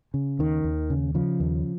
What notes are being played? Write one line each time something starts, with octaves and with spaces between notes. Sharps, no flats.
C#3
D#2 D#3
D#2
C#3
C#3 F3
D#2